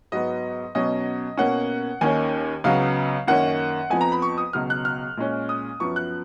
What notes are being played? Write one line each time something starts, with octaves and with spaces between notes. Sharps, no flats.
G#2 F#3 B3 D#5
B2 F#3 C#4 D#5
B2 A#3 C#4 F#5
D#2 D#3 A#3 C#4 G#5
C#2 C#3 F#3 B3 F5
F#2 D#3 A#3 C#4 F#5
F2 F3 B3 G#5
A#5
B5
C#6
D#6
C#2 B2 F#3 F6
F#6
F6
A#2 G#3 C#4
D#6
F#2 F3 B3 C#6
F#6